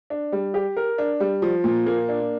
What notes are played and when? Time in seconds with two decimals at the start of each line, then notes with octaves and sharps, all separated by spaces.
0.10 D4
0.32 G3
0.54 G4
0.77 A#4
0.98 D4
1.20 G3
1.42 F3
1.64 A#2
1.86 A#3
2.09 D4